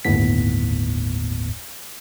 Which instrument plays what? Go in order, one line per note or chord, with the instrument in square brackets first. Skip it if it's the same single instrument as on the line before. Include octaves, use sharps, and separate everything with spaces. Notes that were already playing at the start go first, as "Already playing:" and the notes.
[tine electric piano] G1 D#2 A2 B3 B6